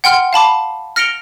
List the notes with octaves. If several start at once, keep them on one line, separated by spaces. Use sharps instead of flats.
F#5 G5 C6 F6
F5 A5 B5 D6
F6 A#6 C#7 D7 F7 G7